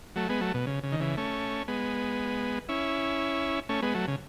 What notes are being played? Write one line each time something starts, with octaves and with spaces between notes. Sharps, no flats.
F#3 A3
G#3 B3
F#3 A3
B2
C#3
C#3
D#3
C#3 E3
A3 C#4
G#3 B3
C#4 E4
A3 C#4
G#3 B3
F#3 A3
C#3